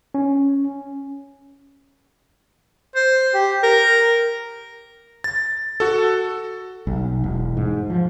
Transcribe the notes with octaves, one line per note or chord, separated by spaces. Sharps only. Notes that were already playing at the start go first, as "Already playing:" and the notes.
C#4
C5
G4
A#4
A6
F#4 A4
B1
E1
G#2
F3